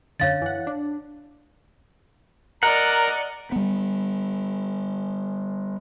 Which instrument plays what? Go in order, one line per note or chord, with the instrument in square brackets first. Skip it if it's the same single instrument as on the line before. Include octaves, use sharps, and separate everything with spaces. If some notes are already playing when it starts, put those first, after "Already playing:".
[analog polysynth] F#2 D3 [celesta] C#5 F5 A6
[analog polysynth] E3 F#5
D4
[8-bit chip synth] A#4 [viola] D5 D#5 [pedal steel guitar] F#5 [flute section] A#5
[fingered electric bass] G3 B3